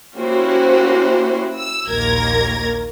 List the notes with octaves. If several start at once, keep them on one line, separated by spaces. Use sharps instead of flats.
A#3 C#4 E4 F#4 G4 C5
E6
A#1 D#2 A#3 A#4 G#6 A#6